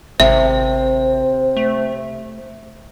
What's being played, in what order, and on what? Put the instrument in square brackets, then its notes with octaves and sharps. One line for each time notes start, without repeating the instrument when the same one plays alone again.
[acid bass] G#1 [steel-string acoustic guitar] C3 [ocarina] C5 [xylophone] E5
[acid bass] A3